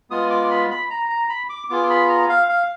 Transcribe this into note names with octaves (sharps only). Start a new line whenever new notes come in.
G#3 B3 F4 D#6
D6
B5
B5
A#5
A#5
B5
D6
B3 F4 G#4 D6
B5
A#5
F5
F5